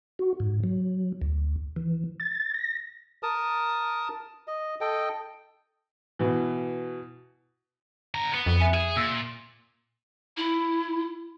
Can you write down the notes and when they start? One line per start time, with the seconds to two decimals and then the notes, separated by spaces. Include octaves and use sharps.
0.19 F#4
0.40 G#2
0.64 F#3
1.22 D2
1.76 E3
2.20 A6
2.54 A#6
3.23 A#4 A5 D#6
4.48 D#5
4.81 A4 D#5 G5
6.19 B2 E3
8.15 D3 A#5
8.34 B3
8.46 F2
8.60 E5 G#5
8.74 G#4 E7
8.97 A#2 E6
10.37 E4